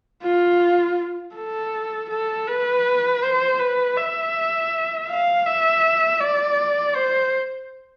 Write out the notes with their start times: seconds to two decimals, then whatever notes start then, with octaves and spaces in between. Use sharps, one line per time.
0.23 F4
1.35 A4
2.10 A4
2.47 B4
3.22 C5
3.59 B4
3.97 E5
5.09 F5
5.46 E5
6.21 D5
6.96 C5